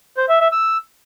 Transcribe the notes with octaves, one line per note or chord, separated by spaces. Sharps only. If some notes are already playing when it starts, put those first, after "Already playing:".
C5
E5
E5
E6